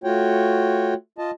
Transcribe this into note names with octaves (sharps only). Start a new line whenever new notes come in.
A3 F4 F#4 C#5 G5
F4 D#5 A5